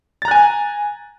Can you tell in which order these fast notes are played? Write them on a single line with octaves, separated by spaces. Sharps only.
A6 A#5 F#6 G#5